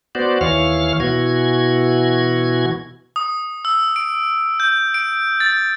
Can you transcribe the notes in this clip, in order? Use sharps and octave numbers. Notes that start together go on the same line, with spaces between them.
B3 F#4 C5 D5
D#2 E3 C#5 F5 F6
B2 E3 F#4 G#6
D#6
E6
D7
G6
D7
A6